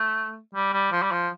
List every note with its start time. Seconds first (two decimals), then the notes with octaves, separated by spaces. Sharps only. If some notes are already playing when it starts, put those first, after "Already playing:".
Already playing: A3
0.54 G3
0.73 G3
0.92 F3
1.02 G3
1.11 F3